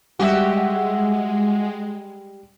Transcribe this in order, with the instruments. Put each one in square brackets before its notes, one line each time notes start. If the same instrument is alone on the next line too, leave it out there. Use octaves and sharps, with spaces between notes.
[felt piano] G3 [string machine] G#3 [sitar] F#4 G4 E5